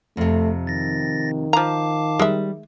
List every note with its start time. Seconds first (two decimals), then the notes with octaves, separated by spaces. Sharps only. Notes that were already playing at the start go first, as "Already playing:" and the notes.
0.17 F2 C3 A3
0.67 D#3 A6 A#6
1.53 F3 F5 A5 A#5 D6
2.19 G3 G#3 E5